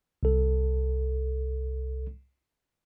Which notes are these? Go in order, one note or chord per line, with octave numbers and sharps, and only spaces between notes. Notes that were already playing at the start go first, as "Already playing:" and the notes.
C2 A4